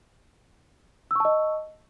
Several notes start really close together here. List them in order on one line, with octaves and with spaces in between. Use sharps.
E6 C#6 A5 D#5